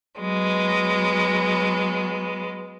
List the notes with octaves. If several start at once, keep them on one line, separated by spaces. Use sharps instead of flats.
F#3 G#3 B3